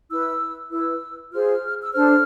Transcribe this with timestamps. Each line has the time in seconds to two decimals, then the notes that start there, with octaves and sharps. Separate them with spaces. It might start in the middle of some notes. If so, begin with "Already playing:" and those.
0.10 E4 B4 E6
0.71 E4 B4 E6
1.32 F4 G#4 C5 F6
1.82 E6
1.93 D4 A4 C5 F6